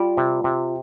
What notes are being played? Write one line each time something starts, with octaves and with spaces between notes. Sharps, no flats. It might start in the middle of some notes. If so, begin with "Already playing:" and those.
Already playing: G3 F4
C3
C3